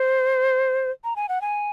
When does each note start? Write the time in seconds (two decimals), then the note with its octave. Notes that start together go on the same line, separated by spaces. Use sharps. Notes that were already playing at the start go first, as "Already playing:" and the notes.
Already playing: C5
1.04 A#5
1.16 G#5
1.29 F#5
1.41 G#5